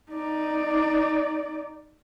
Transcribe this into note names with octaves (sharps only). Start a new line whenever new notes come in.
D#4 D5